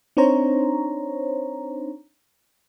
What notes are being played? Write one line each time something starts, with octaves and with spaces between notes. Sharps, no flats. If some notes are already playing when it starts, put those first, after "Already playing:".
C4 D4 D#4 C5 C#5 A#5